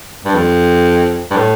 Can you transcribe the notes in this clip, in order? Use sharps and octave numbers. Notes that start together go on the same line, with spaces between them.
G2
F2
G2
A2